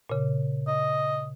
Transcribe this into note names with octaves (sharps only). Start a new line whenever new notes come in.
A#2 C#3
D#5